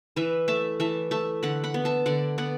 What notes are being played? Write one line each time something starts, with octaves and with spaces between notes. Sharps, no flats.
E3 B4 E5
A3 E5 A5
E3 E5 A5
A3 E5 A5
D3 F#5 B5
F#5 B5
B3
E5 A5
D3 D5 F#5
B3 D5 F#5